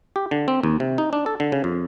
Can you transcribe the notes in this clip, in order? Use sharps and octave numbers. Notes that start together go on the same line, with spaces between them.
G4
D3
C4
D#2
C3
D#4
D4
A4
D3
C#3
F2